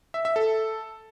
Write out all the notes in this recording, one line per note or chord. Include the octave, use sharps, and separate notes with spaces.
E5
E5
A4